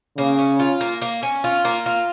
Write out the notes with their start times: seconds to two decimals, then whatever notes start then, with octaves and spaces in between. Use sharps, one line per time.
0.17 C#3 A#3
0.39 C#4
0.59 F4
0.81 A#3
1.02 A#3
1.23 C#4
1.44 F4
1.65 A#3
1.86 F4